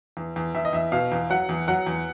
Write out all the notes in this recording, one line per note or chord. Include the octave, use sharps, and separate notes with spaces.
E2
E2
E2 E5
D#5
E2 E5
B2 F5
E2
F#3 F#5
E2
F#3 F#5
E2